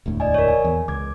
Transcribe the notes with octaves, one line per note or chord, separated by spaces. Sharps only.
E1 D2 A2
D5 D#5 G#5
A#4 C#5
G#5
E2
C#2 D6 G#6